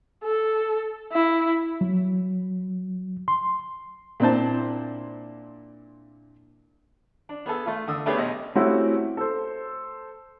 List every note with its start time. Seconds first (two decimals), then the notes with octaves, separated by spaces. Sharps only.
0.23 A4
1.12 E4
1.81 F#3
3.28 C6
4.20 A#2 C4 D4 E4 C5 A5
7.29 D4
7.46 B3 G#4 A4
7.66 A3 F4
7.87 D3 D#6 E6
8.06 A3 B3 D4 G4 G#4 C#5
8.17 B1 D#5
8.55 A3 C4 C#4 E4 F#4 G4
9.17 A4 C5